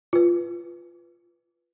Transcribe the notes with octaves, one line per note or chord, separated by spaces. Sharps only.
F4 B4